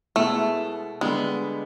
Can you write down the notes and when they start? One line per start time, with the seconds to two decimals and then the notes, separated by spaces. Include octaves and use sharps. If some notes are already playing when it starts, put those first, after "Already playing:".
0.16 B2 G#3 A3 B3 E4
1.01 D3 G3 G#3 B3